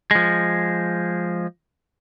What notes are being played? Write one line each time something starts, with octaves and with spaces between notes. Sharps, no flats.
F3 G#3